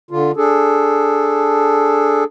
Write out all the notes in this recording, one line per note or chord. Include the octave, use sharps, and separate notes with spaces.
D3 F4
D4 G#4 A4